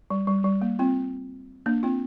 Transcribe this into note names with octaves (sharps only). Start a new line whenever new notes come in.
G3
G3
G3
A#3
C4 F4
A#3 D4
C4 F4